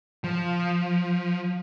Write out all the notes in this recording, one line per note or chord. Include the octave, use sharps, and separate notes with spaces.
F3